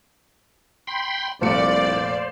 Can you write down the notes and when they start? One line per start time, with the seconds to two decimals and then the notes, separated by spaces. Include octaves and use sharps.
0.87 G5 B5 C6
1.41 F1 C2 A#2 C5 D5 C#7